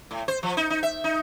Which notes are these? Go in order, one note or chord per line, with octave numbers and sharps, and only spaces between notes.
A2
C5
F3
D#4
D#4
E5
D#4